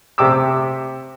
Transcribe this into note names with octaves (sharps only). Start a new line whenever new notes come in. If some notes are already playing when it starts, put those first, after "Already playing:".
C3 G4 D6 E6